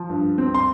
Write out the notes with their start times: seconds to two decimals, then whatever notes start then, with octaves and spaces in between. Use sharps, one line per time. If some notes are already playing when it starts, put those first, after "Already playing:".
Already playing: F3
0.10 G2
0.38 C4
0.54 C6